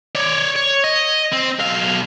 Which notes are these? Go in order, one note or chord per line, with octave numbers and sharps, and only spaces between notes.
C#5 D5
C#5
D#5
C4
B1 F5